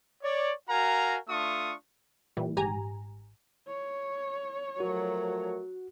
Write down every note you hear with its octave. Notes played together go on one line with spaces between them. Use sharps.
C#5 D5
F#4 A#4 F5 G#5 A#5
A3 D4 F4 C#6 D#6
A#2 E3 G3
G#1 G#2 G4 G#5 A#5
C#5
F3 F#3 A3 F#4 A#4